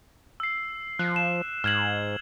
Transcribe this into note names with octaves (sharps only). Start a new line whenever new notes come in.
E6 C7
F3 F#6
E7
G#2 F6 G#6 F#7